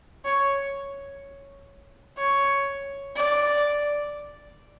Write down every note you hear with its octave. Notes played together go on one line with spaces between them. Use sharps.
C#5
C#5
D5